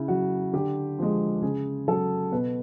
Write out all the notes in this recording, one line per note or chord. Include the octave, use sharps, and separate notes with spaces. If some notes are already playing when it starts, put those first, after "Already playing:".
Already playing: C#3 E4
F#3 F#4
D3 G4
F3 G#3
C#3 G#4
F#3 A4
B2 B4